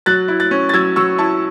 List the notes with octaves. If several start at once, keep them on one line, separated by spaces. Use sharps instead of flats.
F#3 F#6 A6
E4
F#6 A6
C#4
A6
F#3 E6 G#6
F#3 C#6 E6
E4 A5 C#6